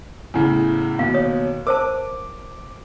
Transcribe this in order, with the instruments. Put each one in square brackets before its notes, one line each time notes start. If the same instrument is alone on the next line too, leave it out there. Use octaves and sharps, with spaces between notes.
[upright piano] E2 A2 C#3 [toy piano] G#5
[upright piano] D#2 B2 [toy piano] F5
[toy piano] C#5 D#6
[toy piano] A#4 C5 A5 [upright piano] D6